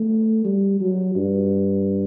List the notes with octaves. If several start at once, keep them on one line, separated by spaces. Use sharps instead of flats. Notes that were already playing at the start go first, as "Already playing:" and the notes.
Already playing: A3
G3
F#3
G2